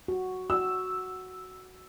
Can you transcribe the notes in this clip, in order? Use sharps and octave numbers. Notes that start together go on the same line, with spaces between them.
F#4
F#4 E6